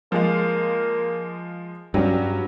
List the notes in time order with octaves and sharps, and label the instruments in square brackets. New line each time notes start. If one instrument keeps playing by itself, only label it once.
[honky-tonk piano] F3 G#3 F5 [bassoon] A#3
[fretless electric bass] G2 [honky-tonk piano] F#3 C#4 [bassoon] G3